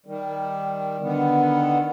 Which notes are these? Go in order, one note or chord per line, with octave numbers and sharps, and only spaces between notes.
D#3 G3
D3 D#3 B3